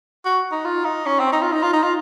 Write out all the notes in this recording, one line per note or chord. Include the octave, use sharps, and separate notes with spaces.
F#4
D#4
F4
D#4
C#4
C4
D#4
F4
D#4
F4
D#4
F4